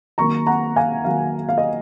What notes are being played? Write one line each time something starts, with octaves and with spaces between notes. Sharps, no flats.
D#3 F#3 A#3 A#5 C#6
F#5 A#5
F5 G#5
D#3 F#3 A#3 F5
F5
D#5